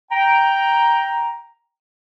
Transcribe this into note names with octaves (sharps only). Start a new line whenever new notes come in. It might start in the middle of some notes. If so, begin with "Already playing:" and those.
G5 A#5